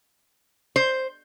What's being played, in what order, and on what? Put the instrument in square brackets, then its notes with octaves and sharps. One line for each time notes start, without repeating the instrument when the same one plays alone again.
[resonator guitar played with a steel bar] C5